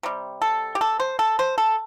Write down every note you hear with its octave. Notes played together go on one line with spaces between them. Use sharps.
C3 G3
A4
G4
A4
C5
A4
C5
A4